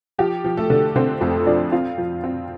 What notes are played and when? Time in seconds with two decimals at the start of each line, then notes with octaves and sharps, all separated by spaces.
0.19 F3 G4
0.44 F3
0.57 A3 A4
0.70 D3
0.96 D3 C4 C5
1.21 F2 A3 A4
1.47 F3 D4 D5
1.72 C4 F4 F5
1.98 F3
2.24 C4